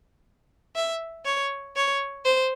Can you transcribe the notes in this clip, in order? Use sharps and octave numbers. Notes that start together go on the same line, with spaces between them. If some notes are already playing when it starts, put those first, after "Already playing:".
E5
C#5
C#5
C5